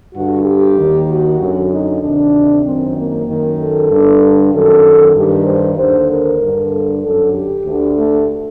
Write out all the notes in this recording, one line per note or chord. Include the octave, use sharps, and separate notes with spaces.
G2 D3 F#4
G4
D#2 D#3
F#4
F#2 D3
D#4
D2 C3 D#3 D4
F#2 D#3 C4
A#3
F#2 D#3
A4
G2 D3
F#2 D#3 A4
G2 D#3 G4
C5
D#2 D3 C5
A#4
G2 D3
A4
F#2 D3 A4
G4
D2 D3
A3